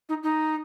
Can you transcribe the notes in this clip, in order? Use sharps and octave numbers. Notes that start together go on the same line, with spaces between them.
D#4
D#4